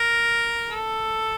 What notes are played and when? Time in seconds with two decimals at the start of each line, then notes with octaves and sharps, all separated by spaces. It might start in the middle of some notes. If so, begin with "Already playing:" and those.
Already playing: A#4
0.69 A4